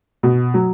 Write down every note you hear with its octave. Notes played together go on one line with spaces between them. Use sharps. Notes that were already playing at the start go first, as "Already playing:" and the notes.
B2
F#3